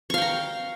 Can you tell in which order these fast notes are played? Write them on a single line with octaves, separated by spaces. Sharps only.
C#6 F5 G5 A#5